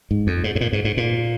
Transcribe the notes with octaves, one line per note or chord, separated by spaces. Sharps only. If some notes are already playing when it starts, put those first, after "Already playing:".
G#2
F2
G#2
G#2
A#2
G#2
G#2
A#2